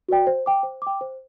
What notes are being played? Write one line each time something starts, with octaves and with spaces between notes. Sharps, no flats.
F#4 B4 D5 G5
C5
G5 D6
C5
G5 D6
C5